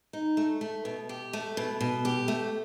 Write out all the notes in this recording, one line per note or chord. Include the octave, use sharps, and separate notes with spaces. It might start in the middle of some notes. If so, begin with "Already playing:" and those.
D#4
A3
A3
B2
G4
A3
B2
B2
G4
A3